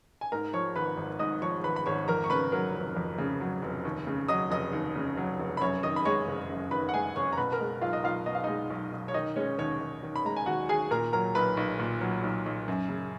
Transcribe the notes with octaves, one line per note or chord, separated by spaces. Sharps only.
G#5
G#2 A#4 A#5
F3 C#5 C#6
G#1 B4 B5
G#1
G#2 D#5 D#6
F3 C#5 C#6
G#1 B4 B5
B5
G#1 C#5 C#6
F2 A#4 A#5
C#6
C#3 B4 B5
F#3 A#4 A#5
F1
F2
C#3
F#3
F1
D#2
C#3
F#3 D#5 D#6
F1 D#5 D#6
D#2
C#3
F#3
F1
B5
F#2 C#5 C#6
D#3 D#5 D#6
B5
G#3 C#5 C#6
F#1
F#2
D#3 B4 B5
F#5
G#3 G#4 G#5
F#1 C#5 C#6
A#5
B2 B4 B5
A#4 A#5
G#3
B1 F4 F5
D#5
B1 F4 F5
B2 D#5
F5
G#3 D#4 D#5
B1
B1
C#5
D#3 D#4 D#5
G#3 C#4 C#5
D#2 C#4 C#5
D#2
D#3
B5
G#3 A#5
G#5
D#2 F#4 F#5
D#2 G#4 G#5
A#2 A#4 A#5
F#3 A#4 A#5
B1 B4 B5
B1
A#2
F#3
B1
B1
F#2
C#3